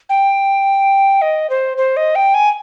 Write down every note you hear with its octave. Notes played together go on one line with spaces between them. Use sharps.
G5
D#5
C5
C5
D#5
G5
G#5